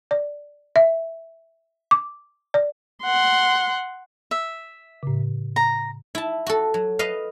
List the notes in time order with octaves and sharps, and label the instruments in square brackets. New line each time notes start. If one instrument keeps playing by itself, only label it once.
[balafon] D5
E5
D6
D5
[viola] F#5 C6
[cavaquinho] E5
[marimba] A2 C#3
[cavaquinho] A#5
[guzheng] E4 A5
F#4 A4
F#3
B4 D#5 F5